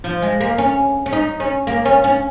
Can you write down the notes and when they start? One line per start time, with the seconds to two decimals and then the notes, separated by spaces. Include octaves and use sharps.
0.04 F3
0.22 G#3
0.41 A#3
0.58 C#4
1.06 C#4
1.13 D#4
1.40 C#4
1.67 A#3
1.85 C#4
2.04 C#4